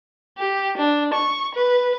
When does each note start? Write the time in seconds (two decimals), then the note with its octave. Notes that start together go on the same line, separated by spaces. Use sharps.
0.38 G4
0.78 D4
1.14 C#6
1.55 B4